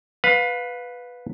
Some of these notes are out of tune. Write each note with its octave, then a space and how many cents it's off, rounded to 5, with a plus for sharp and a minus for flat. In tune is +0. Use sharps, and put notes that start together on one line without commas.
B4 +0 F5 +25